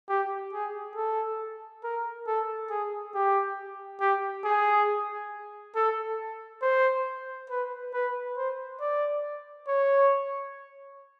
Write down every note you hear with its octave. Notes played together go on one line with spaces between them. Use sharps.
G4
G#4
A4
A#4
A4
G#4
G4
G4
G#4
A4
C5
B4
B4
C5
D5
C#5